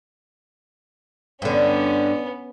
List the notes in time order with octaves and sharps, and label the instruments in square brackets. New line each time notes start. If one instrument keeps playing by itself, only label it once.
[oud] G2 D3 [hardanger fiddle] B3 C#4